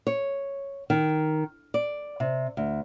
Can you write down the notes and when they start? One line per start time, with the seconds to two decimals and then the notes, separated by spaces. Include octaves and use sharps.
0.07 C#5
0.90 D#3
1.74 D5
2.20 C3
2.57 D2